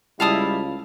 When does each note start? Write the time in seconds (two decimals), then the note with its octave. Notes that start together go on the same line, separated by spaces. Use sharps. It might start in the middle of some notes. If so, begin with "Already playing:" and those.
0.20 C#2 G3 E4 F5 A5 D#6